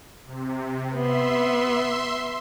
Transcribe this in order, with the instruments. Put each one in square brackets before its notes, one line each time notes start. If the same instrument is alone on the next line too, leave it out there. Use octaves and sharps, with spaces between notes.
[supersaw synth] C3
[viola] B3 [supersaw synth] E5 C6